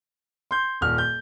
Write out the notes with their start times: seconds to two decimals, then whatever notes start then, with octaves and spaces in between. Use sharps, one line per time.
0.51 C6 G6
0.81 D#1 F6
0.98 G6